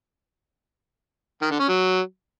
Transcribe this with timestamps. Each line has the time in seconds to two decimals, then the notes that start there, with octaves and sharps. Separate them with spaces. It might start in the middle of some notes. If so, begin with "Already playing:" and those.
1.42 D#3
1.51 D3
1.60 C#4
1.69 F#3